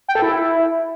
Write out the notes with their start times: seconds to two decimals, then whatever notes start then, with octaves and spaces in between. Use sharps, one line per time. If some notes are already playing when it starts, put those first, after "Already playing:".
0.08 G5
0.15 A4
0.22 E4